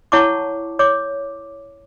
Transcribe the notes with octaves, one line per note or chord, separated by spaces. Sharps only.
E4 C#5 F#5 A5 C#6 D6
C#5 D6